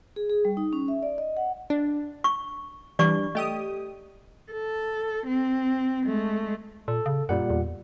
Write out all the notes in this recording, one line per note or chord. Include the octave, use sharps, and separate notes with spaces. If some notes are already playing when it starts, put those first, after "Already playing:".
G#4
G#4
G3
D#4
C#4
E5
D5
D#5
F#5
D4
C#6
E3 G3 D4 D5 C#6
A3 G4 D#5 D#6
A4
C4
G#3 A3
A#2 A4
C#3
F#2 A#2 G3 F#5
E2